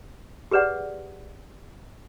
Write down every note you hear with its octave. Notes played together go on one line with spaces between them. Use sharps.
G4 G#4 B4 D5 F#5